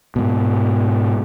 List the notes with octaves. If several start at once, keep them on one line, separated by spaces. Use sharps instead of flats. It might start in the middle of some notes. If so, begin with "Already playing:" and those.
G#2 B2